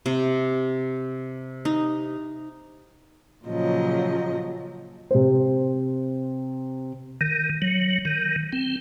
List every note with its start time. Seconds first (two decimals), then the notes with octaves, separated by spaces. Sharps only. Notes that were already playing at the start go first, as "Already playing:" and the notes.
0.06 C3
1.65 D#4
3.46 A#2 C#3 F3 F#3 D#5
5.11 C3 C5
7.21 D#3
7.62 F#3
8.05 D#3
8.53 C4